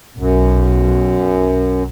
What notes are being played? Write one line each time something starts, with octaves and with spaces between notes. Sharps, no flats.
B1 F#2